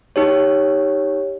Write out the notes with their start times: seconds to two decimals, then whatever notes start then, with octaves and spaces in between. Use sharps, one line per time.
0.16 D#4 G4 C#5